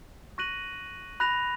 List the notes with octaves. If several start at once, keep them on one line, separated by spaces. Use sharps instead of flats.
C#6 F#6 A#6 D#7 F#7
B5 F#6 A#6 F7